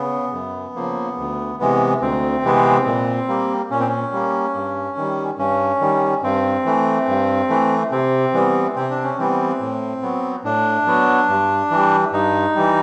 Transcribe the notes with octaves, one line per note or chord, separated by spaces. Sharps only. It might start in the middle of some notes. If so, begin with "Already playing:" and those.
Already playing: C#3 B3
F#2
C#3 F3 A#3
D2
C3 E3 G#3 B3
D2 C4
C3 E3 G#3 B3
A#2
G3 A#3
A#2 C#4
C4
C#4
G3 A#3
G2
D#3 G3
G2 C#4
D#3 G3
G2 C4
E3 A3
G2
E3 A3
C3 C4
E3 G3 B3
C3 C4
D4
C#4
E3 G3 B3 C4
A2
F#3 B3
A2 D4
F#3 B3
G2
E3 G3
G2 D#4
E3 G3